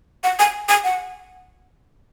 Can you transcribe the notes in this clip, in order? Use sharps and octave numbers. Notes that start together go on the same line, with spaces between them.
F#5
G#5
G#5
F#5